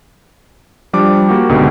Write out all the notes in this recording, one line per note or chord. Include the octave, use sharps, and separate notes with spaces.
F3 G3 D4 D6
A#3 F#4 G4
C#2 G#2 B2 D3